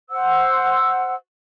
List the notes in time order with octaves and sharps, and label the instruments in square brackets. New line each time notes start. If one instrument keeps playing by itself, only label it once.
[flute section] C5 F#5 E6